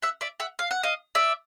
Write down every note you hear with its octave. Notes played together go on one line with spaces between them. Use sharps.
E5 F#5
D5 E5
E5 F#5
F5
F#5
D#5 F5
D5 E5